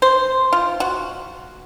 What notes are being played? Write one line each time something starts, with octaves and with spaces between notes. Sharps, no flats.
C5
F4
F#4